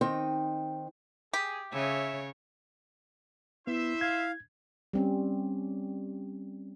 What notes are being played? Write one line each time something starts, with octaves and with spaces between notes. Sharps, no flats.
D#3 C4 D#4 G5
G4 G#4
C#3 C#5 E5
B3 E4 C5 E5
F5 G#6
G3 C4 C#4